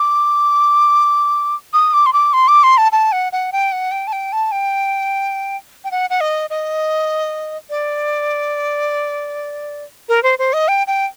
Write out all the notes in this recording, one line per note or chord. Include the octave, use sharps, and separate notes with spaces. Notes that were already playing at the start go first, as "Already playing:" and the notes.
Already playing: D6
D#6
D6
C6
D6
C6
D6
C6
A5
A5
F#5
F#5
G5
F#5
G5
A5
G5
A5
G5
G5
F#5
F#5
D#5
D#5
D5
A#4
C5
C5
D#5
G5
G5